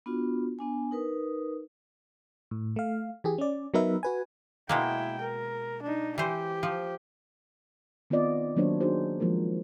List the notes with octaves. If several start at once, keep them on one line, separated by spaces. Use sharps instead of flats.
B3 D4 F4 F#4
B3 D4 G#5
D#4 A#4 B4 D#6
A2
A3 F5
E3 G4 G#4
C#4 D5
F#3 B3 D#4 A#4 B4 E5
F#4 B4 G#5
B2 G#3 A#3 E4 G5
A#4
D4 D#4
E3 G4 C5
F3
D#3 B3 C4 F4 D5 D#5
D#3 F#3 A#3 D4 C5 C#5
D4 D#4 F#4 G#4 C5
F3 G#3 A#3 F#4 A#4